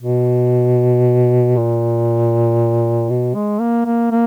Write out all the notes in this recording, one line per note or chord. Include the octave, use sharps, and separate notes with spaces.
B2
A#2
B2
G#3
A#3
A#3
A#3